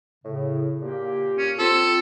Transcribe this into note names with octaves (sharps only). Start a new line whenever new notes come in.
A2 C#3
A#2 A#3 G4
C#4
C4 F4 A4